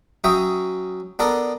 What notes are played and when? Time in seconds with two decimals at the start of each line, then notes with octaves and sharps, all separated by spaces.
0.24 F#3 C#4 E5 G5 D#6
1.19 B3 D4 A4 A#4